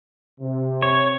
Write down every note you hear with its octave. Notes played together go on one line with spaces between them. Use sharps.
C3
C#5